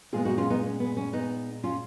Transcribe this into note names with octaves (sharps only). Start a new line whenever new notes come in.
A#2 G#3 B3 F4 G#4
D#4 F#4
C#4 F4
B3 D#4
C#4
B3
C#4
B3 D#4
C#4 F4